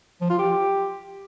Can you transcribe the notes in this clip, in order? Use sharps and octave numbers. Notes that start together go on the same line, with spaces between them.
F3
F4
G4